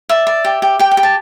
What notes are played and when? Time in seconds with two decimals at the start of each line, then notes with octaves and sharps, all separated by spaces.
0.09 D5 E5
0.27 D5
0.45 G4
0.62 G4
0.79 G4 G5
0.91 G5
0.97 G4
1.03 A5